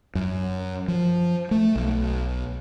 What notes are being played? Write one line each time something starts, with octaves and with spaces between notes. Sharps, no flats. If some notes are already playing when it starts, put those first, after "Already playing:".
F#2
F3
A3
B1